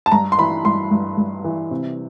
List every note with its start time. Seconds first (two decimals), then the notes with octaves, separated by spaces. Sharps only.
0.06 A5
0.12 G2 A#5
0.32 C6
0.38 E3 B5
0.65 G2 C6
0.91 G2
1.18 G2
1.44 E3
1.71 C3